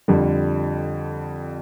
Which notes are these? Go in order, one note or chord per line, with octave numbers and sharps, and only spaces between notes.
F2 D3 G3